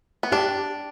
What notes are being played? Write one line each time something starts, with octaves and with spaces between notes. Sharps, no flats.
B3
D4 G4